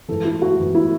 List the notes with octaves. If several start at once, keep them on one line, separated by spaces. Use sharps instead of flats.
G#2 E3 A4
E4
F#4
G#2 E3
E4